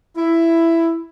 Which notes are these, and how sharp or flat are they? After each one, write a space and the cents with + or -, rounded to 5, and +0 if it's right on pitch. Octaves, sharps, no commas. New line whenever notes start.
E4 +10